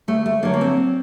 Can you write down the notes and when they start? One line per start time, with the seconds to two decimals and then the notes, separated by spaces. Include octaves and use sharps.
0.08 D2 A3
0.26 A3
0.43 D3 F#3 A#3
0.54 A#3
0.61 C4